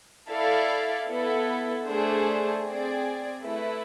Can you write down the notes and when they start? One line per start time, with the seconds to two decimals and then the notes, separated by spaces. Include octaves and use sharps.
0.30 E4 A4 D5 F5
1.09 B3 E4 A4
1.87 A3 D4 G#4 C5
2.65 C4 G#4 D5
3.43 A3 E4 B4